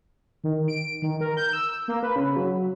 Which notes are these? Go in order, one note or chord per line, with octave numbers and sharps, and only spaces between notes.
D#3
D7
D#3
A#4
G6
E6
A#3
B4
C#3
F#3